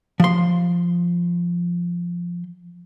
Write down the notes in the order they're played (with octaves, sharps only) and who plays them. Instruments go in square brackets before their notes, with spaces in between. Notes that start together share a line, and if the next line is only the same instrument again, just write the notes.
[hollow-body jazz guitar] F3 C6